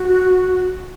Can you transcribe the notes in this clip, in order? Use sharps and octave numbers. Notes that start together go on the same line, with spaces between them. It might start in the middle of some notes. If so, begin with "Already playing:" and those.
Already playing: F#4